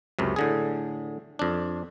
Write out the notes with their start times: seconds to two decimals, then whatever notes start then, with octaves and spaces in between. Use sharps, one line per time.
0.19 C#2 F#2 C3
0.36 A2 D3 G#4
1.39 F2 D4